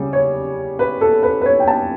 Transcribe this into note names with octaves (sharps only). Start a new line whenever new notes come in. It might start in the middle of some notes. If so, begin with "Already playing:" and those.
Already playing: C#3 G3
C#5
B4
A4
B4
B4
C#5
G5
A5